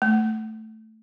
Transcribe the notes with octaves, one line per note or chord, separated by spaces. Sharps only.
A3